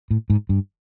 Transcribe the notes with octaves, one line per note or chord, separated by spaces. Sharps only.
A2
G#2
G2